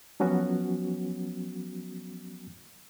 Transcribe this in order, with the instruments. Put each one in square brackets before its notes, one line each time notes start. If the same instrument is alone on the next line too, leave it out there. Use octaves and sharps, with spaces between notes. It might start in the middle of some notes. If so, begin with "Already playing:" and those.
[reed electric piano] F3 F#3 B3 C#4 F#4